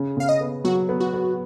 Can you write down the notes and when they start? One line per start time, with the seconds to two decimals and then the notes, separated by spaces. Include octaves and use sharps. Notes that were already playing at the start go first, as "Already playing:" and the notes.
Already playing: C#3
0.17 C#3 F5
0.29 D#5
0.41 B3
0.64 F#3 F#4
0.89 B3
1.00 F#4
1.14 B3